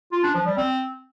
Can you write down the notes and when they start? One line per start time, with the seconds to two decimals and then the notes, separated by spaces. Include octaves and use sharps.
0.12 F4
0.24 D4
0.35 F3
0.46 G3
0.57 C4